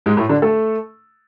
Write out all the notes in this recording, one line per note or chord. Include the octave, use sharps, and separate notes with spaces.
G#2 G#3
A2 A3
D3 D4
A3 A4